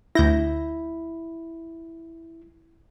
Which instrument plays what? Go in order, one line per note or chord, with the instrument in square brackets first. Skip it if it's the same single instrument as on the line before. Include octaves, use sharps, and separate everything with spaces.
[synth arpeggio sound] D2 G6 A#6 [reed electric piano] E4